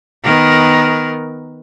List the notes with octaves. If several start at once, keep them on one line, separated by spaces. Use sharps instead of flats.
D#3 B3 A#4